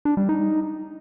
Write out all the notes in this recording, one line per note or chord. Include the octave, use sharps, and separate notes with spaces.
D4
G3
D#4